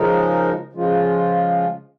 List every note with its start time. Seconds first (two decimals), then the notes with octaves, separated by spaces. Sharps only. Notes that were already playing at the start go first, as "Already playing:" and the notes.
Already playing: C#3 F3 G#3 D#4 A#4
0.73 C#3 F3 G#3 F4